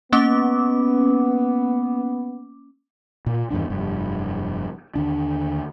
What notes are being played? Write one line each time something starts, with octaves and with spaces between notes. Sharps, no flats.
A#3 B3 C#4 D6
A#2
E2 G2 D#3 D4
F1 G2
D#2 D3 D4